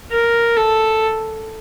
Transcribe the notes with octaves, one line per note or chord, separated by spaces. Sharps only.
A#4
A4